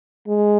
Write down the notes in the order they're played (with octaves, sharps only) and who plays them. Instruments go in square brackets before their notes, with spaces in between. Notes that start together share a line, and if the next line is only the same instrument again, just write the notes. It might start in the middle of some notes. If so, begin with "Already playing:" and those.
[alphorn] G#3